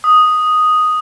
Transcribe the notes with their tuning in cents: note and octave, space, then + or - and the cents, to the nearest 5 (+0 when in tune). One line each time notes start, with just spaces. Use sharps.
D#6 +0